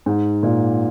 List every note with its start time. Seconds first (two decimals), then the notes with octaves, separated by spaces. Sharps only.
0.06 G#2
0.43 A#2